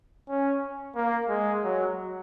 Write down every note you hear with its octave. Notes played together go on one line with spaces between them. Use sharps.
C#4
A#3
G#3
F#3